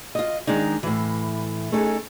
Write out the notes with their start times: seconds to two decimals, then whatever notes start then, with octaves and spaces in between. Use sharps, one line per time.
0.15 F4 D#5
0.47 D#3 G#3 D4 D#4
0.83 A2 E3
1.72 A3 C#4 D#4 G#4 A4